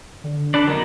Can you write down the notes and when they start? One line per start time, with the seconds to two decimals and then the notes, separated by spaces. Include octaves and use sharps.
0.24 D3
0.54 D4 A4 B4 D5
0.67 F#3 B3 D#4 A#4